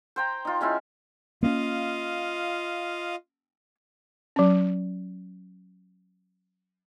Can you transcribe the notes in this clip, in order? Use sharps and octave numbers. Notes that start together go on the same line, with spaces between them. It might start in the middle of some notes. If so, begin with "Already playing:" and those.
C5 G5 A#5
D#4 F4
G#3 C#4 E4 F4
A#3 B3 C#4 F4 D#5 F5
F#3 C#4